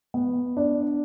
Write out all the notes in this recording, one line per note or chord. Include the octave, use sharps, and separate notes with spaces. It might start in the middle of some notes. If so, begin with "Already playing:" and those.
B3
D4